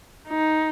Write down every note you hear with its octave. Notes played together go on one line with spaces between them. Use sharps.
D#4